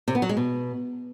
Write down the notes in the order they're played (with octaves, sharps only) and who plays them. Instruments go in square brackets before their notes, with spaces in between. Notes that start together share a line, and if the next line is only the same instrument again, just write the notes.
[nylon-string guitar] C3
B3
F#3
G#3
B2